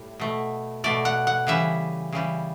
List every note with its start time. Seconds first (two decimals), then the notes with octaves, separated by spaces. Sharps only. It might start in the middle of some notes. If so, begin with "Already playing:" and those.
Already playing: A2 G3
0.20 B2 A3
0.84 B2 A3 D5
1.05 F#5
1.27 F#5
1.47 C#3 E3 G3 E5
2.13 C#3 E3 G3